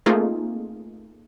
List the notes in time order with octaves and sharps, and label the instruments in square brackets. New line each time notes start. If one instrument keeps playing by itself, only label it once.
[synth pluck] A3 A#3 C4 D#4 F4 G#4